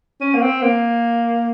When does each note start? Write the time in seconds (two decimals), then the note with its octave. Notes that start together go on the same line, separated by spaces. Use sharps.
0.21 C#4
0.34 A#3
0.42 C4
0.62 A#3